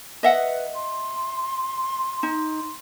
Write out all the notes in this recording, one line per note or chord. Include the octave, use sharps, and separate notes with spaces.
B4 D#5 E5 F#5
C6
D#4